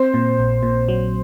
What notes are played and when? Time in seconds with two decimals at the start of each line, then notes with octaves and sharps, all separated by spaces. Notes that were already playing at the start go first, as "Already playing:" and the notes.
Already playing: C4 C5
0.14 A#2
0.39 A#1
0.63 A#2
0.88 F#3